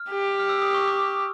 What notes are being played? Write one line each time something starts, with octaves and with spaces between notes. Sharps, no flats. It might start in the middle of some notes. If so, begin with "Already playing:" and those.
Already playing: F6
G4
F6
E6
D#6
C#6
D6